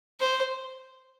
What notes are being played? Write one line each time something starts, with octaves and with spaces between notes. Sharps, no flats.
C5